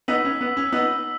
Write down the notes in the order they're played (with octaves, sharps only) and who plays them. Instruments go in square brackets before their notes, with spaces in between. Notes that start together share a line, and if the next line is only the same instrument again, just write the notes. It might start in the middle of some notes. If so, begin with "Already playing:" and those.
[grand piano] B3 D#4 [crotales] E6 B6 F#7
[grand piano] C#4
B3
C#4
[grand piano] B3 D#4 [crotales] E6 B6 F#7